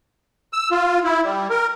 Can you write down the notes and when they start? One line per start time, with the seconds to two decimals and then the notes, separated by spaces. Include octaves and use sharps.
0.53 E6
0.71 F4
1.04 E4
1.24 G3
1.50 A#4